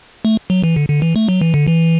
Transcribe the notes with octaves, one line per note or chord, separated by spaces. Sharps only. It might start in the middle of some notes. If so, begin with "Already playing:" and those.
A3
F#3
E3
D3
D3
E3
A3
F#3
E3
D3
E3